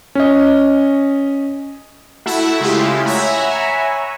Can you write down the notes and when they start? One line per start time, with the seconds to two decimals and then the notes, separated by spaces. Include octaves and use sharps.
0.15 C#4 D#5
2.26 A3 E4 F#4 E5 F#5
2.60 C#3 G#3 A3 E4 F4 G4
3.05 C#5 E5 F#5 G#5 A#5 B5